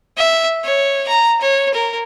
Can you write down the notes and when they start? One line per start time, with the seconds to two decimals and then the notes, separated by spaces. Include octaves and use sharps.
0.17 E5
0.64 C#5
1.08 A#5
1.41 C#5
1.74 A#4